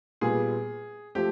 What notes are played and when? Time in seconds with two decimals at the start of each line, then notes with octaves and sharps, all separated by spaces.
0.21 A#2 G3 B3 G#4
1.15 F3 A3 C4 G4